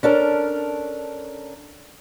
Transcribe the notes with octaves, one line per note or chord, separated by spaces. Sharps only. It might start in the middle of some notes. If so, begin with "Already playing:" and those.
C#4 D4 A4 A#4